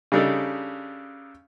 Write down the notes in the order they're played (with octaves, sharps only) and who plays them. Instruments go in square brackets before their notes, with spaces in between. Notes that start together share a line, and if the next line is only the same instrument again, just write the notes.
[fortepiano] C#3 G3 D4 D#4 A4